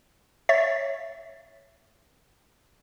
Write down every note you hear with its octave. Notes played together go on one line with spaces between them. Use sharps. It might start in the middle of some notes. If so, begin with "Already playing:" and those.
C#5 E5 A6 B6